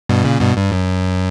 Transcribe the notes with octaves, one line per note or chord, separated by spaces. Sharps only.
G2 B2
A#2 C#3
G2 B2
G2
F#2